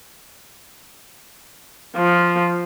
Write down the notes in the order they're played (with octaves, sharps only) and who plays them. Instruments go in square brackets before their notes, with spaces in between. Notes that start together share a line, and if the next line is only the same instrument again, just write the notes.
[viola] F3